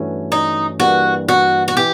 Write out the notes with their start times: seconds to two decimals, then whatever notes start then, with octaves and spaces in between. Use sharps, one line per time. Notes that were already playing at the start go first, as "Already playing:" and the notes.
Already playing: G2 E3 A3 C#4 F#4
0.32 D#4
0.80 G2 E3 G3 A#3 F#4
1.29 F#4
1.68 F#4
1.77 E3 G4